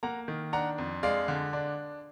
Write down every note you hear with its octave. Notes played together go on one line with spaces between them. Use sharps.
A#3 F#5 A#5
D#3
D4 F#5 A#5
F2
G#3 D5 F5
D3
D4